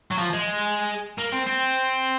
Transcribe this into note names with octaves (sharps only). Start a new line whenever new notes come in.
F#3
F3
G#3
A#3
C4
C4